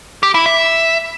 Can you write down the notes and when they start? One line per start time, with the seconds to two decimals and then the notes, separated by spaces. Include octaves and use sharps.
0.23 G4
0.34 E4
0.46 E5